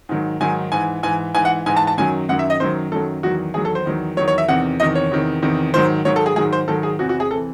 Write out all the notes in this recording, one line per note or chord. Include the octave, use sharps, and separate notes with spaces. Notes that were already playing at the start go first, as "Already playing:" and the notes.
G#2 D#3 F#3
G#2 D#3 F#3 G#5
G#2 E3 G#5
G#2 E3 G#5
G#2 E3 G#5
F#5
G#2 E3 G#5
A5
A5
F#2 D#3 F#3 G#5
F#2 D#3 F#3 F#5
E5
D#5
F#2 D#3 F#3 C5
F#2 D#3 F#3 A4
E2 D#3 F#3 F#4
E2 D#3 F#3 G#4
A4
C5
E2 D#3 F#3
E2 D#3 F#3 C#5
C#5
E5
E2 C3 D#3 F#5
E2 C3 D#3 D#5
C#5
E2 C3 D#3
E2 C3 D#3
G#2 D#3 F#3 C5
G#2 D#3 F#3 C#5
A4
G#4
G#2 D#3 F#3 G#4
C5
G#2 D#3 F#3 A4
G#4
E2 C3 E3 F#4
F#4
G#4
C3 E3 A4